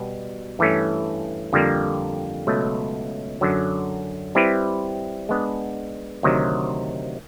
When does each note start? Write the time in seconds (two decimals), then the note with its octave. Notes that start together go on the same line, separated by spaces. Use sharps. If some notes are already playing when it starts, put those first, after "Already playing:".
Already playing: B2 G3 B3
0.59 G2 E3 A3 C#4
1.53 F2 D3 G3 A#3
2.47 C#2 B2 F#3 A3
3.41 F#2 D3 F#3
4.35 G3 C4 E4 G4 B4
5.29 G#3 B3 D4
6.23 D2 C3 D#3 F#3